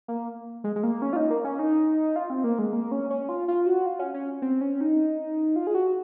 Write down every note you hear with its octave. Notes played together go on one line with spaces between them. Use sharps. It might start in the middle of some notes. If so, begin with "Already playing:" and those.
A#3
G#3
G#3
A#3
C#4
F4
D#4
A#3
C#4
D#4
F4
C4
A#3
G#3
A#3
C#4
C#4
F4
F4
F#4
F4
C#4
C#4
C4
C#4
D#4
F4
G#4
F#4